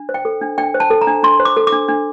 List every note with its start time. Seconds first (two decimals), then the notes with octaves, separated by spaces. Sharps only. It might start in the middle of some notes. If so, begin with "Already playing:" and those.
Already playing: D4
0.09 C5
0.14 G5
0.25 A4
0.41 D4
0.58 D4 G5
0.74 C5
0.80 A5
0.90 A4
1.01 A#5
1.07 D4
1.23 D4 C6
1.40 C5
1.45 D6
1.56 A4
1.67 D6
1.73 D4
1.88 D4